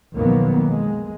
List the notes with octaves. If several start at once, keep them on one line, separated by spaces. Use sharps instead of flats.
B1 F2 D#3 F#3 A#3 B3
G#3